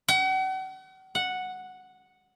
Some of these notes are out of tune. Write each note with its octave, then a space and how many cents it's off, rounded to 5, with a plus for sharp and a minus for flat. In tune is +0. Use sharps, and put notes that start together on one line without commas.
F#5 +40
F#5 -5